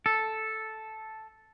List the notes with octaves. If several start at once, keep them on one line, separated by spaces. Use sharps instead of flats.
A4